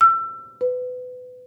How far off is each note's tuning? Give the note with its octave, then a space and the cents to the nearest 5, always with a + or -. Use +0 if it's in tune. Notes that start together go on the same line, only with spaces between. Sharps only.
E6 +30
B4 +25